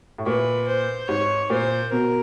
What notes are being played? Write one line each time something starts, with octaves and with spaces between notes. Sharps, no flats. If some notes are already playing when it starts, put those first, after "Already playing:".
A2
A#2 B4
C5
G#2 C#5
A#2 C5
B2 A#4